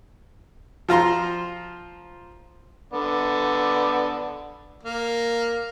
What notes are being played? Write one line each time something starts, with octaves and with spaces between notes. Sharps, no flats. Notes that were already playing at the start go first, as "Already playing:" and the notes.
F3 F4 A#5 C6
D3 B3 D5
A#3